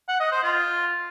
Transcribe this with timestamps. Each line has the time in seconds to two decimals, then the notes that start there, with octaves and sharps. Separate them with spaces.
0.08 F#5
0.20 D#5
0.32 C5
0.43 F4